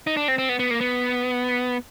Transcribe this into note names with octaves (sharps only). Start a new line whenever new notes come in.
D#4
D4
C4
C4
B3
B3
A#3
B3